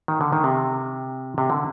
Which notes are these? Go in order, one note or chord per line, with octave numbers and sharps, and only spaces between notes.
D#3
D3
D#3
C3
C3
D3